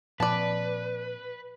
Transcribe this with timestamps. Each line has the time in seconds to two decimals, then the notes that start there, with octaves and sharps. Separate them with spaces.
0.20 A#2 F3 C4 B4 D5 A5